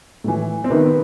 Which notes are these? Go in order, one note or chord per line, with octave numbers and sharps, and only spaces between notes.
A2 E3
C4
C3 D#3 B3